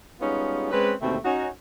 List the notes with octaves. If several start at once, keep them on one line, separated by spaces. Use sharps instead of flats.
G3 G#3 B3 C#4 D#4 F4
G#3 C4 C#4 B4
D#2 B2 D3 A3 C4
C#4 D#4 F#4